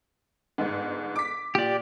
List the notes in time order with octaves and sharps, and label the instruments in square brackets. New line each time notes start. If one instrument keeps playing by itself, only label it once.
[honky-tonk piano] G1 G#2
D6 B6
[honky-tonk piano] A#2 [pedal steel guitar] G4 D5